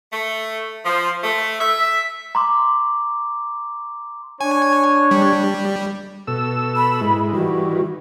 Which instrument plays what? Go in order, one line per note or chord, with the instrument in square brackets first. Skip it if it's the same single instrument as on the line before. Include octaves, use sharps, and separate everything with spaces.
[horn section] A3
F3
A3
E5
[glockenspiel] A#5 C6 D6
[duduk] D4 [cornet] C#5 [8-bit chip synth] G#5
[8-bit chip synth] G3
[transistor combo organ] B2 A4 E6
[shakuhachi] B5
[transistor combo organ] G#2 G#3 E4
[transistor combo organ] D#3 E3 G3 [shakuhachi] F#4